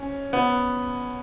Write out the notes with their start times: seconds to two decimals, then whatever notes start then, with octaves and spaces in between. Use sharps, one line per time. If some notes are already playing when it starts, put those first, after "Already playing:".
Already playing: C#4
0.33 B3